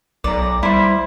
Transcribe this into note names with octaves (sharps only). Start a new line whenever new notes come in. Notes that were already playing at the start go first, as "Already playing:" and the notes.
B1 D5 A#5
G3 E4 C5